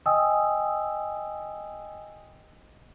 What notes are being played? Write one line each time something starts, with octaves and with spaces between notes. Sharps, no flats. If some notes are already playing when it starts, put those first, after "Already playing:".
D#5 G5 G#5 D#6 E6